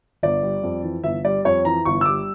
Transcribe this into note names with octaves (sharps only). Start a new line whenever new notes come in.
G1 D5
G3
F2
E3
G1 E5
G3 D5
F2 C#5
E3 A#5
G1 C#6
E6
G3 D6